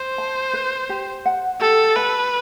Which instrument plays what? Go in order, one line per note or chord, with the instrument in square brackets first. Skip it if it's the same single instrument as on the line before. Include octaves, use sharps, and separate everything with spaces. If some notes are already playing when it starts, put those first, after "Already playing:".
Already playing: [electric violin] C5
[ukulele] A5
B4
G4
F#5
[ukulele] G4 [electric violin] A4
[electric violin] B4 [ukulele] A5